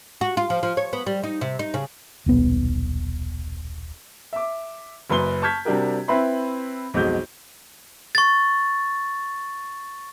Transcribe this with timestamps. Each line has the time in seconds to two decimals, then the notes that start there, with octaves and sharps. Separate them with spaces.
0.21 F#4
0.37 F4
0.50 F3
0.63 F3
0.77 C#5
0.93 B3
1.07 G3
1.24 D#4
1.41 C3
1.59 D#4
1.74 C#3
2.26 D#1 B1 B3
4.33 E5 D6
5.10 F#1 F#2 B4 C6 G7
5.42 A5 C#6 F6 G6 G#6 B6
5.65 C3 G3 D4 F#4 G4 A#4
6.08 C4 E4 B4 E5 B5 C6
6.94 B1 F2 G#3 F#4 G6
8.15 C#6 A6